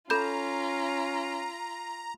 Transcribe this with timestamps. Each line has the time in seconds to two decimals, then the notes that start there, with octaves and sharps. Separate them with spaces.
0.10 C#4 F4 A4 A#5 B5 G6